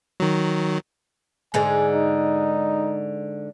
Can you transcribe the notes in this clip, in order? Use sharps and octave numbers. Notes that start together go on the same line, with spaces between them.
D#3 F#3
G#2 D3 G#3 G#5
D#4